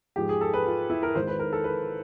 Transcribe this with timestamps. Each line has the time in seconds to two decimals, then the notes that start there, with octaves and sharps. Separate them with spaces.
0.16 G#2 F3 G#3 G4
0.29 G#4
0.41 A4
0.54 B4
0.66 F4
0.90 E4
1.03 A#4
1.15 G#1 G#2 D#3 C5
1.27 B4
1.39 A#4
1.53 A4
1.64 B4